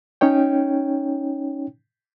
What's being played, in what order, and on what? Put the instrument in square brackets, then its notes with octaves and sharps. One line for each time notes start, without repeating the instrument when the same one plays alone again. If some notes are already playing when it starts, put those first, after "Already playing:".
[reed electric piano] C#4 D#4 C#5 G5